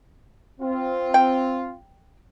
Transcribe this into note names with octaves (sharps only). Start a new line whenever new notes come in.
C4 F4
G5